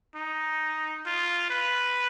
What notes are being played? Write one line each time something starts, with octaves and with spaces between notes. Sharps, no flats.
D#4
F4
B4